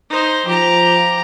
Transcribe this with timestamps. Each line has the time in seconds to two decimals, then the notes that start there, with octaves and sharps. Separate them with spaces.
0.10 D#4 C5
0.47 F3 G4 A#5